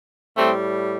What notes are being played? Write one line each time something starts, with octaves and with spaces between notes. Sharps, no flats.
A2 G3 A3 C4